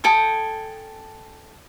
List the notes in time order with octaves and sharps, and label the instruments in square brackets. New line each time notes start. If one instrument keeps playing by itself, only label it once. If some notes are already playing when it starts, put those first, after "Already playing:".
[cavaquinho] A4 G5 G#5 D#6